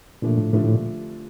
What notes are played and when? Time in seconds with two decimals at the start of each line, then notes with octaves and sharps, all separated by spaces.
0.22 A#2 D3 F3 A3 D4
0.38 A2
0.53 A2 D3 F3 A3 D4
0.64 A2
0.74 A#2